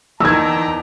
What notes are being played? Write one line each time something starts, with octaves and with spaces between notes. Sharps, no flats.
E2 D#3 G5 A5 A#5 E6 G#6